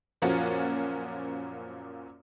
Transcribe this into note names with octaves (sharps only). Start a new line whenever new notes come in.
F#2 A#2 F3 A#3 C#4 F#4